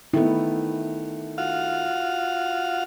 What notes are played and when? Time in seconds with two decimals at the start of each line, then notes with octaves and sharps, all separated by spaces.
0.14 D#3 A3 B3 E4
1.38 F4 F#4 F5